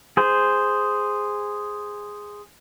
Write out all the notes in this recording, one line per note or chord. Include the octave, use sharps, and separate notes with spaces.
G#4 C5